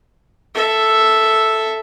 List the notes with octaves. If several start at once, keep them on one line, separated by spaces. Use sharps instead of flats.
A4 E5